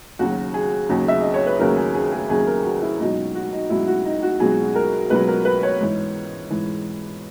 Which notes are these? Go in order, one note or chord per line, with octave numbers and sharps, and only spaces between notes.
D#2 C#3 F#3 F#4
G#4
D#2 C#3 F#3
E5
D#5
C#5
B4
D#2 C#3 F#3 A#4
G#4
G#4
G#4
D#2 C#3 F#3 G#4
A#4
F#4
E4
C#2 B2 F#3 D#4
F#4
D#4
C#2 B2 F#3 E4
F#4
D#4
F#4
C#2 B2 F#3 G#4
A#4
C#2 B2 F#3 B4
A#4
B4
C#5
G#2 E3
G#2 E3